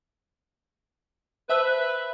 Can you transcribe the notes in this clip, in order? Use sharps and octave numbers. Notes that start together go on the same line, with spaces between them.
B4 C5 E5 A5 E6